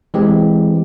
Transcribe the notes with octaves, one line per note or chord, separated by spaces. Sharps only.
E3 G#3 C4 G4